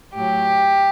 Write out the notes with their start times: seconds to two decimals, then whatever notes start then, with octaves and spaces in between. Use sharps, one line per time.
0.14 A2 F#3 G4